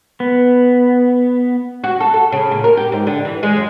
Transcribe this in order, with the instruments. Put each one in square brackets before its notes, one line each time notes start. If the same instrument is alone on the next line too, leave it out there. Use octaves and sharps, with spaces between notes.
[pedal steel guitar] B3
[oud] F#4
A4
A4
C#3
A#2
A#4
G4
G#2
D3
E3
G#3
F#2